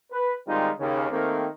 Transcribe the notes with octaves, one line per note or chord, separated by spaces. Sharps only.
B4
D#3 G3 G#3 C4 D#4 F4
D#2 C#3
D#3 A3 A#3 C4